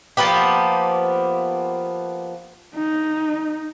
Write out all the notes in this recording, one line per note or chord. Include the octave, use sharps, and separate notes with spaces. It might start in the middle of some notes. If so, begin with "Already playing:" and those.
F3 A#3 B3 G4
D#4